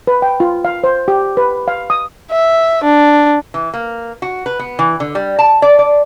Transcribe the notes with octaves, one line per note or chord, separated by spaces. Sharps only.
B4
G5
F4
F5
C5
G4
B4
F5
D#6
E5
D4
E3
A#3
F#4
B4
B3
E3
D3
G3
A5
D5
D5